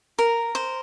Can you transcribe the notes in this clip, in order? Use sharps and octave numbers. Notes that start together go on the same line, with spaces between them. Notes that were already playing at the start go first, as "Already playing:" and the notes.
A#4
C5